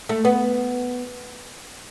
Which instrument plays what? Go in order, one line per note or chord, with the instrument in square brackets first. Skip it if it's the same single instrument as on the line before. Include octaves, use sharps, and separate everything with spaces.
[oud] A3
B3